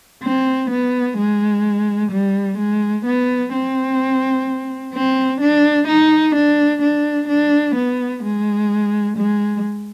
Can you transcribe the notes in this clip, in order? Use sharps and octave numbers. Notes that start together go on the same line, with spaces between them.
C4
B3
G#3
G3
G#3
B3
C4
C4
D4
D#4
D4
D4
D4
B3
G#3
G#3